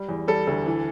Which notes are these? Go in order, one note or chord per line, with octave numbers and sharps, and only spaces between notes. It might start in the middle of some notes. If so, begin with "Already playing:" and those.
Already playing: G3
E2
G3 A4
D2 A4
E3